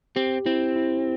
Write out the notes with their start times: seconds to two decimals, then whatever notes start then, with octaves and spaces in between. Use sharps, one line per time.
0.16 C4 G4
0.46 C4 E4
0.76 E4